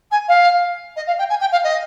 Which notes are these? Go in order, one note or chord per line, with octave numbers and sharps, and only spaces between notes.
G#5
F5
D#5
F5
G5
G#5
G5
F5
D#5